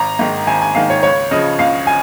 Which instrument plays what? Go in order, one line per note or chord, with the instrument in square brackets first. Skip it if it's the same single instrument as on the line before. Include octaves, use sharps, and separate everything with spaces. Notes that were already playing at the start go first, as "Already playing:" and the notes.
Already playing: [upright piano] G#1 A#5
G#2 D#3
G#1 G#5
G#5
G#2 D#3 F5
C#5
C#2 C#5
C#3 F3 D#5
C#2 F5
G#5